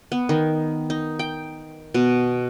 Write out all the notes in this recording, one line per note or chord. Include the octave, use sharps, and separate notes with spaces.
B3
D#3
D#4
G5
B2